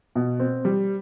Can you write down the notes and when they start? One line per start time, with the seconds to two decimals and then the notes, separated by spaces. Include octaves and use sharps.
0.16 B2
0.40 C4
0.65 G3